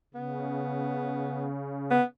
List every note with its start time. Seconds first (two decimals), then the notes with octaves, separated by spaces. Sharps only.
0.14 C#3 B3
1.91 B3